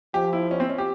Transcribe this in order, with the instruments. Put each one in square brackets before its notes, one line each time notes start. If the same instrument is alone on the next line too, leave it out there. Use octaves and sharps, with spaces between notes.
[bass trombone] F3 [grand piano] G4
[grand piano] E4
C#4
C4
C#4
G4